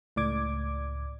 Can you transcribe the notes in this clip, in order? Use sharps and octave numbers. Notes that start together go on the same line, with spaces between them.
C#2 A2 D5 D6 G#6